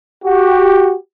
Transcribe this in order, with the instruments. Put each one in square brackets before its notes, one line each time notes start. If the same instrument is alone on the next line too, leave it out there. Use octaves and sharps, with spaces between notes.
[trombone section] F#4 G4